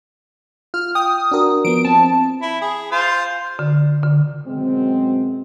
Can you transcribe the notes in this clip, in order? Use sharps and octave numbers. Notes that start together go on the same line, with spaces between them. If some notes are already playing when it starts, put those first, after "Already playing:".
F4 F6
G5 D#6
D4 F#4 A#4
F3 B3 D7
C4 A5
E4
G#4
F4 C5
D3
D3
F#2 B2 G#3 C4